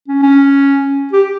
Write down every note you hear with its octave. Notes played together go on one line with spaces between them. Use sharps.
C#4
C#4
G4